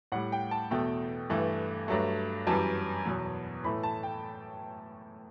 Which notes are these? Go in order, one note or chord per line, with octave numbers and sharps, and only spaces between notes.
A2 G3 F#5
G5
A5
E2 B2 A3 G5
G2 E3 A3
G2 F#3 A3
F#2 E3 G3 A5
E2 B2 F#3
A2 E3 A3 B5
A5
G5